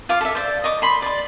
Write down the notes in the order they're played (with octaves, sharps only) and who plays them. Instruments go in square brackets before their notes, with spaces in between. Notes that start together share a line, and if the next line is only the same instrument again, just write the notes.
[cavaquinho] F4 F5 D6
A4 E5
C5 D5
D#5 C#6 D6
B5 C6
D5 C6